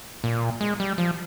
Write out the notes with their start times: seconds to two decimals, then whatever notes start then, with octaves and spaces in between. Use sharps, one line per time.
0.24 A#2
0.61 G#3
0.80 G3
0.98 F3